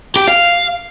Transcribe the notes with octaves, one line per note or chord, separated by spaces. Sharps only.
G4
F5